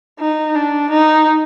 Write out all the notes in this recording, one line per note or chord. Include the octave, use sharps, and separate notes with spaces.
D#4
D4
D#4